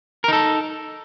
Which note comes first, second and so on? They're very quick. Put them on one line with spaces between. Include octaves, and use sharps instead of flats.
A#4 D#4 A4